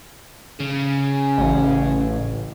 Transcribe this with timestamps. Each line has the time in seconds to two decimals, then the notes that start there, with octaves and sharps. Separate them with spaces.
0.60 C#3
1.38 A1